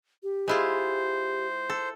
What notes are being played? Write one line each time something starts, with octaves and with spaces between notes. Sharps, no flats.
G4
G#3 E4 F4 C5
A4